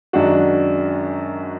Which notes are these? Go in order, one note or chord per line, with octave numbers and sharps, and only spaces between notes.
F#2 D#3 G#3 D4 F#4